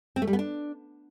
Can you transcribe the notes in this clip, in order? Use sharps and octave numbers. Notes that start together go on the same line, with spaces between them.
C4
A3
G3
B3
D4